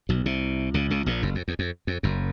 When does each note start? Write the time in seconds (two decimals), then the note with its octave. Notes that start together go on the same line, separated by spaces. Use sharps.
0.09 B1 B2
0.26 C2 C3
0.74 C#2 C#3
0.90 C#2 C#3
1.06 A#1 A#2
1.22 F#1 F#2
1.35 F2
1.48 E2
1.59 F2
1.87 F2
2.03 F#1 F#2